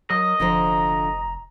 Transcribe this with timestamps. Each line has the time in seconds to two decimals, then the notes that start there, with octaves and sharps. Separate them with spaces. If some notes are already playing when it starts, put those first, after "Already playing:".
0.10 F#3 A#4 D#5
0.40 F1 D3 F3 C5 A#5